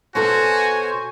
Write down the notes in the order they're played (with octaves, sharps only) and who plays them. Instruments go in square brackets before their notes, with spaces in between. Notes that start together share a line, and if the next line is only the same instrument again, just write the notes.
[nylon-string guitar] B2 A4 [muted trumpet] F#4 [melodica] C5 C#5 [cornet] G#5